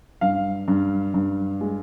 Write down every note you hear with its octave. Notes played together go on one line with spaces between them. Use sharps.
G2 F5
G2
G2
G#3